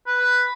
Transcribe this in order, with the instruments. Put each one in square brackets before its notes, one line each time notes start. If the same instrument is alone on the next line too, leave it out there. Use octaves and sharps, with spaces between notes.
[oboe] B4